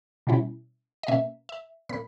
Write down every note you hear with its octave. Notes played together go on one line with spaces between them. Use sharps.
B2 G3 C#4 E4
D#5
B2 A#3 C#4 E5
E5
A#2 A#3 B5